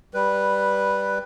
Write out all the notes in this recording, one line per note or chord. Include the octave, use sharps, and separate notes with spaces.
G3 B4